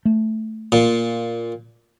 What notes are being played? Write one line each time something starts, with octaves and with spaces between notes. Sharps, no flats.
A3
A#2